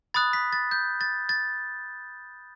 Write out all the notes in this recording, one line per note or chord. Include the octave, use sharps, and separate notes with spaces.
B5 D#6 F#6 A6
B6
A6
G6
A6
A6